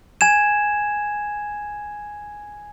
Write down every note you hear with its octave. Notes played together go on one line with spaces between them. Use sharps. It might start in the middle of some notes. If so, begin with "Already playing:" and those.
G#5 G#6 E7